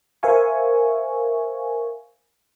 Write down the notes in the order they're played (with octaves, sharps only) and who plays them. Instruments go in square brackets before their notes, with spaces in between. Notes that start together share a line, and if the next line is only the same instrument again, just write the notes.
[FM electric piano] A#4 C5 E5 F5 G#5 C#6